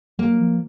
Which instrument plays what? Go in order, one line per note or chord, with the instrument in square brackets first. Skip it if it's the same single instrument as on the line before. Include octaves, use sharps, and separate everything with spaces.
[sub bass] F#3 [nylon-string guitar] A#3
[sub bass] F3